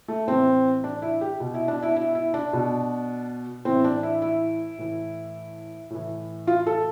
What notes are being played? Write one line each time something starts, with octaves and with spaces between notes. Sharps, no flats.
A3
A2 E3 C4
D4
E4
G4
B2
E4
D4
E4
E4
E4
D4
B2
A2 E3 C4
D4
E4
E4
A2 E3
A2 E3
F4
A4